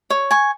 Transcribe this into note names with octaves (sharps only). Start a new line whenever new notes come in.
C#5
G#5 C#6